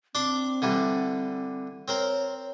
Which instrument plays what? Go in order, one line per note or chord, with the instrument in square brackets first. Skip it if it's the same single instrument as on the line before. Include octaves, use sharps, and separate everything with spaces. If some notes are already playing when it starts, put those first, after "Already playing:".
[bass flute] C4 [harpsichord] D4 C6 D6
[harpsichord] D3 E3 G3
[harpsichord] C4 A#4 C5 [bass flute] C#5